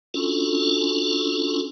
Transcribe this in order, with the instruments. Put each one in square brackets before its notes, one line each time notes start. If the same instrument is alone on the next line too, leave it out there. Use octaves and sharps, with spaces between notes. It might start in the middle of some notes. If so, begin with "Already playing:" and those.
[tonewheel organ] C#4 D4 F4 F#4 A4